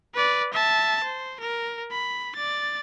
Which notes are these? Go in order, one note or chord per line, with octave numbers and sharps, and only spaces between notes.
B4 D5
E5 A5
C5
A#4
B5
D5 A6